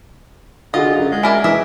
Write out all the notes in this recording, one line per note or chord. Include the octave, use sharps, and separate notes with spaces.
D3 F4 F#4 G#4 D#5
F#2
G#3
E4 A#4 D5 G#5
E3 D#5 E5